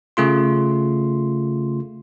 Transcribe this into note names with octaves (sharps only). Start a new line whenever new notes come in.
C#3 A3 F4 C6